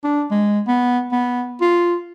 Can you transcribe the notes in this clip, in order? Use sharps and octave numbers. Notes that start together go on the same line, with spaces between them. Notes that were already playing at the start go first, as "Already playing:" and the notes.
D4
G#3
B3
B3
F4